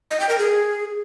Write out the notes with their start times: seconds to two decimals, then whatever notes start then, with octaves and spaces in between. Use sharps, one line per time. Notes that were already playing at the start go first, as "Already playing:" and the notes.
0.11 D#5
0.20 G5
0.29 A#4
0.39 G#4